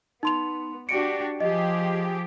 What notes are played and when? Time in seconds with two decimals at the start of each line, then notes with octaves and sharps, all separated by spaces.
0.23 B3 D#4 C6 F7
0.89 D4 F#4 G4 C#7 D7
1.41 F3 G4 G#4 D#5